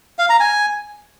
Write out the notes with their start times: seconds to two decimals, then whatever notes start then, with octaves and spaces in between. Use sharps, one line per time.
0.19 F5
0.29 A#5
0.40 G#5